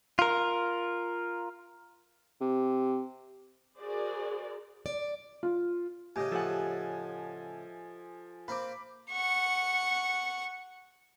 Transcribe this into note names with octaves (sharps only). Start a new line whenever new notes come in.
F4 A#4
C3
F#4 G#4 A#4 C5 D5
D5
F4
A2 C#3 G4 D#5 G#5
F3 A4 F#5 G#5
A#3 C4 B5 D6
F#5 C#6